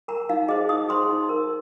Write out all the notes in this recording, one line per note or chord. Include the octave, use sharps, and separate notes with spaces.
A#4 A#5
D#4 F5
G#4 C5 D#5
D#4 D#6
G#4 C5 C6
D#4
A#4